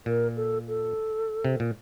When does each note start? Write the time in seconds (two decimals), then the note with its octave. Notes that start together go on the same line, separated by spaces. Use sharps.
0.06 A#2 A#4
0.37 A4
0.68 A4
1.45 C3
1.60 A#2